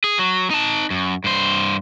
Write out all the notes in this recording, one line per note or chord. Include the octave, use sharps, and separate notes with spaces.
G#4
F#3
D#4 A5
F#2
G2 C5